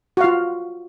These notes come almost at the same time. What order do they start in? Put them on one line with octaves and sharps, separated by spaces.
F#4 F5 F4